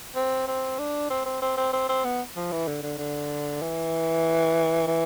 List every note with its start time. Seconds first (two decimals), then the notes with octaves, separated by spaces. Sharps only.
0.16 C4
0.48 C4
0.79 D4
1.10 C4
1.26 C4
1.42 C4
1.57 C4
1.73 C4
1.89 C4
2.05 B3
2.36 F3
2.52 E3
2.68 D3
2.83 D3
2.98 D3
3.62 E3
4.87 E3